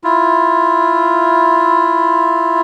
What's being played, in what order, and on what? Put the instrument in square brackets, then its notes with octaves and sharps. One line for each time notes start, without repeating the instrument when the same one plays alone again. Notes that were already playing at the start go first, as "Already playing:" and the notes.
[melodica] E4 F4